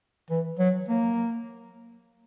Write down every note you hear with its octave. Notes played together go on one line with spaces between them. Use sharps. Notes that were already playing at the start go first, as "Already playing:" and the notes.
E3
F#3
A#3